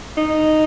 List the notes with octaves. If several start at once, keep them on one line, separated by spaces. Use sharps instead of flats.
D#4